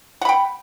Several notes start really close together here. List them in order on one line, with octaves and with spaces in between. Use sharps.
F#5 B5 G5